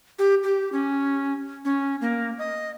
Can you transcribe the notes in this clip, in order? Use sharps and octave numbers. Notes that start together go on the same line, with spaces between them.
G4
G4
C#4
C#4
A#3
D#5